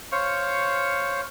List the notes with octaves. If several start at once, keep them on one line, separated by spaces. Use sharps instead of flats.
C5 C#5 F5 C#6